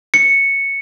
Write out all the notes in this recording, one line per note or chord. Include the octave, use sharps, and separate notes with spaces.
C#7